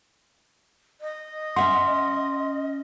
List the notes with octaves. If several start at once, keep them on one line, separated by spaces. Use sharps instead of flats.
D#5
C#4 E5 F#5 C6